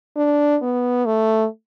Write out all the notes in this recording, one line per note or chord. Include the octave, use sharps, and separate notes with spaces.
D4
B3
A3